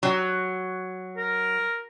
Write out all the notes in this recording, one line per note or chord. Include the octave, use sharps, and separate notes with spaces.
F#3
A#4